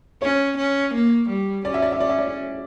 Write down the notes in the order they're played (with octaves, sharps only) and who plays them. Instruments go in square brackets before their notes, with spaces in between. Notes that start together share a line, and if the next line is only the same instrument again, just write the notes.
[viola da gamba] C#4 [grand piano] C#5
[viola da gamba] C#4
A#3
G3
[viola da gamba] C#4 [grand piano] D5
[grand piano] E5
D5
E5
[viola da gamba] C#4 [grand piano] D5
[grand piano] E5
D5